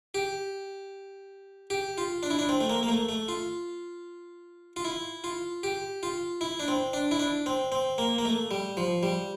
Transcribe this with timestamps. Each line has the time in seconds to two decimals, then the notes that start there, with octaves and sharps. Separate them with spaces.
0.14 G4
1.70 G4
1.98 F4
2.23 D4
2.30 E4
2.39 D4
2.49 C4
2.60 A3
2.70 A#3
2.83 A#3
2.88 A3
3.09 A3
3.28 F4
4.76 F4
4.85 E4
5.24 F4
5.63 G4
6.03 F4
6.41 E4
6.60 D4
6.68 C4
6.93 D4
7.11 E4
7.19 D4
7.46 C4
7.72 C4
7.98 A#3
8.18 A#3
8.25 A3
8.51 G3
8.77 F3
9.03 G3